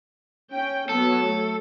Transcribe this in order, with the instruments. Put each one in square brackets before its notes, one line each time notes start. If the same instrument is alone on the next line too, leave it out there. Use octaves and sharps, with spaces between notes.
[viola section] C#4 G5
[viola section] F#3 B3 [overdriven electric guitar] A4
[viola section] A3